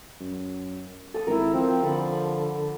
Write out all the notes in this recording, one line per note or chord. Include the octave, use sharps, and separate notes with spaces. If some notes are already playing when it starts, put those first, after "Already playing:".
F#2
A4 D#6
G#1 E4 A#4 E6
F3 C4
D3 A4 B5